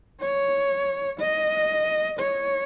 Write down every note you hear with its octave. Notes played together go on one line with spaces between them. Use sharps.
C#5
D#5
C#5